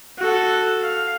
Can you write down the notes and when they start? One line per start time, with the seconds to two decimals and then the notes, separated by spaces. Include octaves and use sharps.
0.19 F#4 A4
0.82 F5